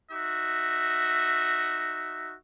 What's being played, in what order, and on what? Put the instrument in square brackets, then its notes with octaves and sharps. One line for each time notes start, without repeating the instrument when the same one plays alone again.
[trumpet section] D#4 F#4 E5